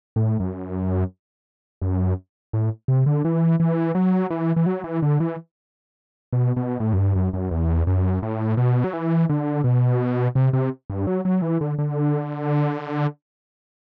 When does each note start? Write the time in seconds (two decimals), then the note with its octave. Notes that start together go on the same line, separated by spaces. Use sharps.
0.16 A2
0.40 F#2
1.82 F#2
2.53 A2
2.88 C3
3.06 D3
3.25 E3
3.60 E3
3.95 F#3
4.30 E3
4.56 E3
4.66 F#3
4.84 E3
5.02 D3
5.20 E3
6.33 B2
6.56 B2
6.80 A2
6.93 F#2
6.98 G2
7.15 F#2
7.33 F#2
7.51 E2
7.87 F#2
8.22 A2
8.57 B2
8.84 F#3
8.93 E3
9.29 D3
9.64 B2
10.35 C3
10.53 C3
10.90 G2
11.07 F#3
11.25 F#3
11.42 E3
11.61 D3
11.79 D3